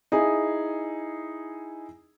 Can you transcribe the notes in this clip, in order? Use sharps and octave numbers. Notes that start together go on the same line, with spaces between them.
D#4 E4 G#4